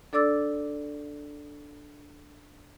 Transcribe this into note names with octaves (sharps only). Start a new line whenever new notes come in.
D4 A4 D5 D6 E6 A6